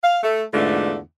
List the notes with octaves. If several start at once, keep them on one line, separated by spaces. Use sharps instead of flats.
F5
A3 A4
E2 G#2 D3 A3 D4 F4